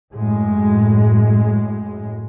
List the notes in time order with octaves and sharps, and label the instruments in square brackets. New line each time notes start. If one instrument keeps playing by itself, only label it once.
[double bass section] F#2 A2 G#3